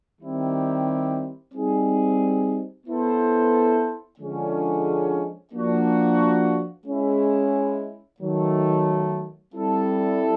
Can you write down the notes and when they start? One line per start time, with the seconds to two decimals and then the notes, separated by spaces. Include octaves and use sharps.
0.19 D#3 G3 C4 E4 G4
1.53 G3 C4 D#4 G#4
2.86 B3 E4 A4 C5
4.19 D3 F3 G#3 C#4
5.53 F3 A#3 D4 F#4
6.85 G#3 C#4 E4
8.20 D#3 F#3 A3
9.52 G3 C4 E4 A4